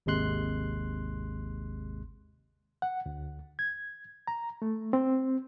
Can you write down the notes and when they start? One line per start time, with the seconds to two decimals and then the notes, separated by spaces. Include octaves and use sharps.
0.06 G#1 D#2 C3 G#3 C6 F#6
2.82 F#5
3.06 D2
3.59 G#6
4.27 A#5
4.62 A3
4.93 C4